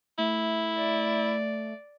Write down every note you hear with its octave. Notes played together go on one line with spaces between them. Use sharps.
A3 E4
D5